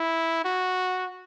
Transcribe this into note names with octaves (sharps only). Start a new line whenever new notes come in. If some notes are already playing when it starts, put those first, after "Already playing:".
Already playing: E4
F#4